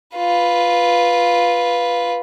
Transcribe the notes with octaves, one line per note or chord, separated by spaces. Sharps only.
F4 B4